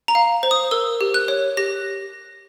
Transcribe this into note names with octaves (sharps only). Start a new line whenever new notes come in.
A#5
F5
C5
D#6
A#4 E6
G4
F#6
C#5
G4 A#6